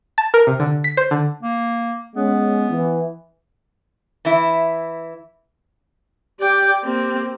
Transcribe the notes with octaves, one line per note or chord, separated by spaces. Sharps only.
A5
A#4
C3
D3
B6
C5
D3
A#3
G#3 B3 C#4
E3
E3 E4
G4 D5 G5
A#3 C4 G4